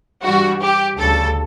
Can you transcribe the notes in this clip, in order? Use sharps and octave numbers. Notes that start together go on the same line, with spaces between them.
G2 E3 G3 F#4
G4
D2 C#3 G3 A4